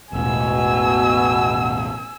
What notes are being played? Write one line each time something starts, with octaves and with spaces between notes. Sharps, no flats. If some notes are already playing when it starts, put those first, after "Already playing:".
E1 A1 B2 G#5 E6